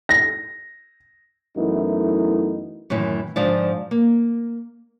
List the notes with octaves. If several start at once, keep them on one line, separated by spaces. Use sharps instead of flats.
A#6
F#2 E3 A3 B3 D#4 E4
F#2 A2 D#3 E3
G#2 D3 F3 C5 D5
A#3